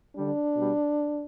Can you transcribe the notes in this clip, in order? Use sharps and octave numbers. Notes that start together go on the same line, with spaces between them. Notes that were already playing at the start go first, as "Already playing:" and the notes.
D3 G3 D4
B2 G3